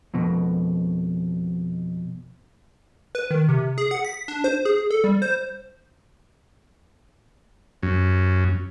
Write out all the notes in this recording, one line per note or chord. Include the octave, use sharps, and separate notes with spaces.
F2 B2
B4
D#3
C3
G#4
F#5
B6
D4
C5
G#4
A4
G3
C5
F#2